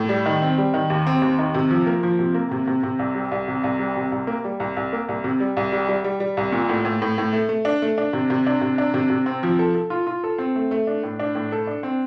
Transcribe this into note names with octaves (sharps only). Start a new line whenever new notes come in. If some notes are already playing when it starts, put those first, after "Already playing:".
Already playing: A2
G3
D#3
C4
G3
D#3
D#2
C4
D#2
D#3
C3
F3
A#3
F3
C3
A#3
C3
C3
C3
C2
G3
C2
C3
C2
G3
C3
C2
A#3
G3
C2
C2
A#3
C2
C3
G3
C2
G3
G3
G3
G3
C2
A#2
A2
A2
A2
A2
A3
A3
D4
A3
D4
C3
C3
D4
C3
D4
C3
C3
C4
F3
A4
A4
F4
F4
A4
C4
A3
A3
D4
A2
D4
A2
A4
D4
C4